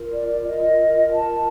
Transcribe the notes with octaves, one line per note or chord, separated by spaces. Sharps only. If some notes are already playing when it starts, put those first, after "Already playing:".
Already playing: F4 A#4
D5
D5
D#5
A5